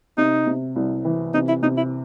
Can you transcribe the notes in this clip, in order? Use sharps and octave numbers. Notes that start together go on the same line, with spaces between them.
C3 D#4
C3
C2
E3
C3 D#4
E4
C3 D#4
E4